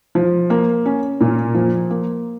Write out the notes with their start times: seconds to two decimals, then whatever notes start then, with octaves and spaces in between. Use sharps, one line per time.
0.15 F3
0.50 A#3
0.85 C#4
1.21 A#2
1.55 F3
1.90 A#3